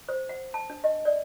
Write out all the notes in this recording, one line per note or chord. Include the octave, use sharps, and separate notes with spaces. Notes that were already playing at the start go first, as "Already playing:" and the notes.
C5
F#5
A5
D4
D#5
D5